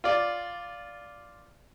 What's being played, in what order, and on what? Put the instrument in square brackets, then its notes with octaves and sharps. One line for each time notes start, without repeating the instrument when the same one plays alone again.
[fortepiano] F4 D5